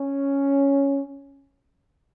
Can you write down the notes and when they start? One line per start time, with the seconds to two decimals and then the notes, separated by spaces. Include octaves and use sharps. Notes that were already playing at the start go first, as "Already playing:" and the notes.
Already playing: C#4